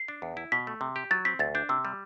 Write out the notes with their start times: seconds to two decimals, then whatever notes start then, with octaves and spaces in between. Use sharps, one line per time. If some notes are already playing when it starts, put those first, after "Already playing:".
Already playing: C7
0.08 D4
0.22 E2
0.37 E4
0.52 B2 B6
0.67 A3
0.81 C3
0.96 G4
1.11 F#3 A6
1.25 C4 B6
1.39 D2 A6
1.55 D4 G6
1.69 C3 E6
1.85 G3